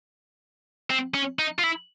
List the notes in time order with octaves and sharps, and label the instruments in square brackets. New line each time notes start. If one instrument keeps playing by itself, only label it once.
[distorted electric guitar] C4
C#4
D#4
F4
E4